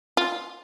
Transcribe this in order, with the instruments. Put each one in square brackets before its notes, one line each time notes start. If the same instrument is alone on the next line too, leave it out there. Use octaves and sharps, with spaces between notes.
[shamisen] F4